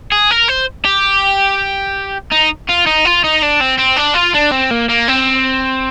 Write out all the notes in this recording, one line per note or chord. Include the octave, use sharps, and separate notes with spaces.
G#4
A#4
C5
G4
D#4
F4
D#4
F4
D#4
D4
C4
C4
D4
F4
D4
C4
A#3
A#3
C4